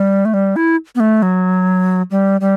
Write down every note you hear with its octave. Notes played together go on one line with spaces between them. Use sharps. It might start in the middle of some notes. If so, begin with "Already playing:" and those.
Already playing: G3
A3
G3
E4
B3
A3
F#3
G3
G3